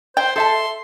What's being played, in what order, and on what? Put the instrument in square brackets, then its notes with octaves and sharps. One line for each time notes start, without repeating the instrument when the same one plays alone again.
[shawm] C5 [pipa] G5
[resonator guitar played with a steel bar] A4 E5 A5 [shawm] C6